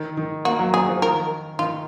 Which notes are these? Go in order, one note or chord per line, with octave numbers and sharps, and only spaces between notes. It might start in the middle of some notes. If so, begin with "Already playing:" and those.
Already playing: D#3
D#3
A#3 F#4
F#3
F#3 G#4
F3
D#3 A#4
D#3 F4